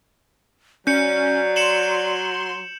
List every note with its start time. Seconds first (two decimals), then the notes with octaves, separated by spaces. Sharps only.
0.87 F#3 C#4 D5 G6 C#7
1.56 C6 C#7 E7 F#7